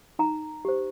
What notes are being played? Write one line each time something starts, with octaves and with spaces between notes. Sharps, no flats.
D#4 A#5
G4 C5